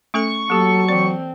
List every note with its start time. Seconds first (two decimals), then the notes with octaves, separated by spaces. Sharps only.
0.14 A3 C#4 A4 C#6
0.50 F#3 A#3 G4 A4
0.89 E3 C4 D5